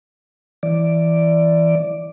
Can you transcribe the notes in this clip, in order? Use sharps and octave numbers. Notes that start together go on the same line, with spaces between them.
E3 D5